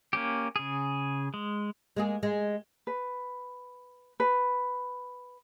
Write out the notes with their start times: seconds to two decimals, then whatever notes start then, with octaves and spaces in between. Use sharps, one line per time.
0.13 A#3 C#4 G4
0.56 C#3 G#4
1.34 G#3
1.97 G#3 A#3 G#4
2.23 G#3
2.87 B4
4.20 B4